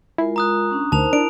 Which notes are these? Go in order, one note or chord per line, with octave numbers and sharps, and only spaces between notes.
G#3 E4 F4 A#4
A#5 D#6 F#6
C#4 D4
D2 D#4 A#4 C5 A5 F7
D4 E4 A#4 D7